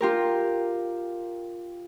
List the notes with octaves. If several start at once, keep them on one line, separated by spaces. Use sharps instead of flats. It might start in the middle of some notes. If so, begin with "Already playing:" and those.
F4 G4 A#4